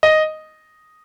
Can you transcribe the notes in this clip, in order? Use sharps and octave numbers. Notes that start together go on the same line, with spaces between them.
D#5